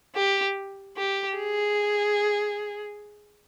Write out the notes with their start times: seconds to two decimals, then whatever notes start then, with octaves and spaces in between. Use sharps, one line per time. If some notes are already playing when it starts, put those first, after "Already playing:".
0.15 G4
0.97 G4
1.38 G#4